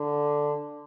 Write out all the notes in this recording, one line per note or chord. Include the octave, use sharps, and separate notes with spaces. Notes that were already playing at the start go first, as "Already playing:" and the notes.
Already playing: D3